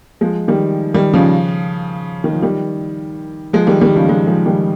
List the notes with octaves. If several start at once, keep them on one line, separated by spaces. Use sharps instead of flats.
F3 G#3
D#3 G3
D#3 G3
C#3 F3
D#3
F3
D#3 G3
F3 G#3
D#3 G3
D#3 G3
C#3 F3
F3 G#3
F3 G#3
D#3 G3